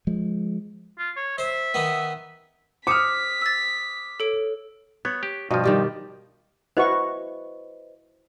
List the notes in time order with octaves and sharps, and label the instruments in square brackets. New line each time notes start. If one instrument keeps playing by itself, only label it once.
[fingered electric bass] F3 G#3
[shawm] F4
C#5
[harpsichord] C5 [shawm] E5
[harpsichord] D#3 B3
[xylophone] C5 C#7 E7 [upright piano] D6 D#6 F6 [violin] B6
[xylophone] E6 A6
A4 C#5 D7
[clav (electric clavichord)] B3 [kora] C#5
[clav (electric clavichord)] G4
[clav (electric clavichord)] G2 F3 [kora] B2 D#5
[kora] D#3 G3 G4
[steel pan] E4 F#4 C#6 [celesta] B4 C5 D#5